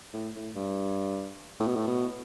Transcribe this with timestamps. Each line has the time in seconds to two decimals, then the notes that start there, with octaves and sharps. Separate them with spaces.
0.14 A2
0.35 A2
0.55 G2
1.60 A2
1.67 B2
1.76 A2
1.87 B2